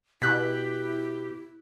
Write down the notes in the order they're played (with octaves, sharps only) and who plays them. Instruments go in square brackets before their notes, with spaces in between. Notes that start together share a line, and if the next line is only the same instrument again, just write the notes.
[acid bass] B2 [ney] E4 [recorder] G4 [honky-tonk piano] F#6 B6